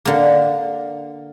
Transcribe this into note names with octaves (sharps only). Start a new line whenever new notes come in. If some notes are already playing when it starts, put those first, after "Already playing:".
D3 A#3